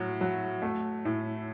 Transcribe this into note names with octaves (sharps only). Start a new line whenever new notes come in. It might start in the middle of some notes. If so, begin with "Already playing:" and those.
Already playing: A2 F#3
F#3
A3
A2